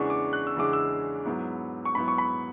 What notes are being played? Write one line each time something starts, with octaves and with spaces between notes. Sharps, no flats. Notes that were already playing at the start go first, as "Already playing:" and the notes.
Already playing: E2 C#3 E3 G#3 D4 C#6
D6
F#6
E6
E2 C#3 E3 G#3 D4 D6
E6
G#2 F#3 B3 E4
C#6
G#2 F#3 B3 E4 B5
C#6
B5